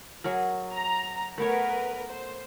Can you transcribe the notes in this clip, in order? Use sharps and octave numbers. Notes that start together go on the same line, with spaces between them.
F#3 G#4 A#4
A#5
A3 B3 A#4 B4 C#5
C5